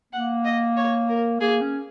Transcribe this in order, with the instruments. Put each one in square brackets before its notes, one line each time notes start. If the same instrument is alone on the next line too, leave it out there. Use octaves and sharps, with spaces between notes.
[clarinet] A#3 [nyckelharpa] F#5
[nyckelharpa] D#5
C#5
A#4
[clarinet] A#3 [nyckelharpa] G#4
[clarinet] C#4